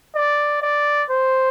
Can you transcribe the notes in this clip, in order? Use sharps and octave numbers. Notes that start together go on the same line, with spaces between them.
D5
D5
C5